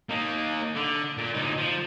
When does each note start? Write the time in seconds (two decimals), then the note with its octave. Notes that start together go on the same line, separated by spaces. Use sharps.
0.09 A#3 D#4
0.76 D3
1.18 A#2
1.34 D2 D#4
1.57 F3